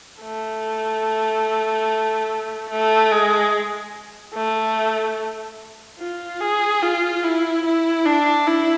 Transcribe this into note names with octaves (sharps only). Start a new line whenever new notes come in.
A3
A3
G#3
A3
F4
G#4
F4
E4
E4
D4
E4